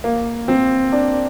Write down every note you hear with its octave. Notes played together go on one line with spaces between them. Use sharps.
A#3
C4
D4